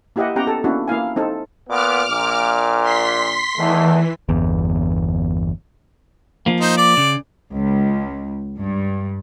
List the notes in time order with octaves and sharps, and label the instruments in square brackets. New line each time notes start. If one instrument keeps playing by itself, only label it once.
[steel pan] A#3 E4 G4 D#5 E5 F#5
B3 C#4 G4 F#5 G5 A#5
A4
A#3 B3 C#4 D4 E4 F#4
A#3 E4 F5 G#5
C4 D#4 A4
[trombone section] A#2 B3 [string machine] D6 F6
[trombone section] A#1 A#2
[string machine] C6 B6
[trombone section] E2 D#3 A3 [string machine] E3
[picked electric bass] G1 E2
[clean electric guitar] F3 A#3
[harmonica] D#4 C5
D5 D6
[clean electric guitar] C#3
[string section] C#2
G2